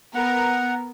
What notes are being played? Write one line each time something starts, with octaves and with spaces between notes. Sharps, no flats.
B3 A#4 F#5